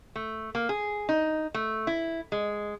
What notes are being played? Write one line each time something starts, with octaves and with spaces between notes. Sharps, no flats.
A3
A#3
G#4
D#4
A3
E4
G#3